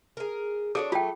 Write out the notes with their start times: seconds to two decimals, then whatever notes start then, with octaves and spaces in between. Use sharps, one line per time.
0.17 G#4 A#4
0.75 D4 F#4 G#4 A4 C#5 D6
0.92 F#3 A3 F4 G5